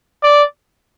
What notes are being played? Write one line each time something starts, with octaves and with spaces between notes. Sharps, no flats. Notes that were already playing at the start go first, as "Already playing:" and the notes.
D5